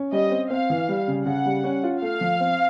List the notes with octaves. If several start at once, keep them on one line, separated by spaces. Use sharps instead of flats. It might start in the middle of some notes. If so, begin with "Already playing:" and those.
Already playing: C#4
G3 D#5
C4
C4 F5
E3
G3
C#3
C#3 F#5
G3
C#4
F4
A3 F5
F3
C4